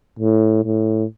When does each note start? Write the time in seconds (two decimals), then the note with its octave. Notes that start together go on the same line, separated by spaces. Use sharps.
0.19 A2
0.64 A2